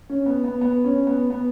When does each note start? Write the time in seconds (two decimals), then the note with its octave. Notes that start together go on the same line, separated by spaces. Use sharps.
0.09 C#4
0.26 B3
0.44 B3
0.61 B3
0.84 C#4
1.07 B3
1.30 B3